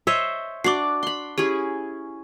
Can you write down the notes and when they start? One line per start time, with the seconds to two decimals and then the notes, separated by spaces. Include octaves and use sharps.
0.07 C5 C#5 D#5 E5
0.64 D4 F#4 D5 D6 C7
1.03 B5 C6
1.38 C#4 E4 G4 G#4